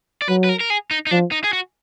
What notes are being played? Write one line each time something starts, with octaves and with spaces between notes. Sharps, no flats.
D5
F#3 B4
B4
A#4
A#4
G#4
D#4
D#4
F3 D4
D#4
G#4
F#4